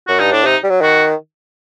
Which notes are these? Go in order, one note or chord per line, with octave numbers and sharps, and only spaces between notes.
F#2 F#4
G2 D#4
A2 D4
C3 D#4
G3
F#3
D#3 F#4